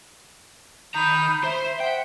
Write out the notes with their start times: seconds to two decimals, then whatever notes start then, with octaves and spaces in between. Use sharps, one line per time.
0.94 D#3 A#5 B5 D#6 G6
1.44 C5 E5
1.80 E5 F#5 G5